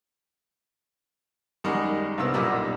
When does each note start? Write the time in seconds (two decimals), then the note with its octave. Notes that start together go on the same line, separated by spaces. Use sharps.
1.64 F#2 D#3 G3 G#3 D#4
2.18 C2 G2 B3 E6
2.34 B1 F#2 A#2 G3 D#5 E6